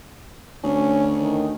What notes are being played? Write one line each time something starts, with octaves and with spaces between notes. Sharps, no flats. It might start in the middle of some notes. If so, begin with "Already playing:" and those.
D2 C#4
D#3